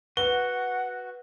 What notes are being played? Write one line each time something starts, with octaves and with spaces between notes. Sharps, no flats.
F#4 B4 F#5 G7